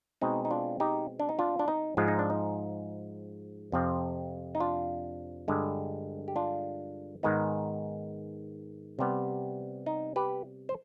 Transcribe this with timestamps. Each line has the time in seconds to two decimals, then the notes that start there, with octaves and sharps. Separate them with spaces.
0.21 B2 G#3 C4 D#4
0.45 D#4
0.51 D4 F4
0.80 D#4 G4
1.20 D4
1.29 D#4
1.39 D4 F4
1.59 D4
1.68 D#4
1.97 G#2 F3 G#3 F4
2.08 D#4
2.19 D4
2.30 D#4
3.72 F2 C3 F3 C4
4.55 D#4
4.60 D4 F4
5.48 G2 D3 G#3
6.28 G4
6.36 D4 F4
7.23 G#2 D#3 G#3 B3 D#4
8.99 C3 G3 B3
9.86 D#4
10.16 G4 B4
10.69 C5